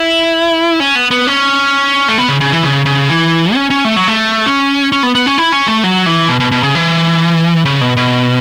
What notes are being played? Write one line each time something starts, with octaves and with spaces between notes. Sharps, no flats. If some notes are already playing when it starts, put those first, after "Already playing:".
Already playing: E4
C#4
B3
B3
C#4
A3
B3
C#3
C#3
E3
C#3
C#3
E3
C#4
C#4
A3
F#3
A3
C#4
C#4
B3
B3
C#4
E4
C#4
A3
F#3
E3
B2
B2
B2
C#3
E3
C#3
B2
B2